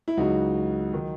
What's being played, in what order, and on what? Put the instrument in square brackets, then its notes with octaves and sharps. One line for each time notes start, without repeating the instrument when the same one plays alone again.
[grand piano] E4
C#2 C#3 F#3 D#4 F#4
D#3 F#3